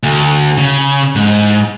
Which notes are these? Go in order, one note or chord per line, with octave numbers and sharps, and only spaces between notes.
D2
C#3
G#2